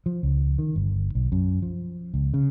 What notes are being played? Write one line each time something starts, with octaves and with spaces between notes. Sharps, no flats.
F3
C#2
D#3
G1
B1
F#2
F3
C#2
C#3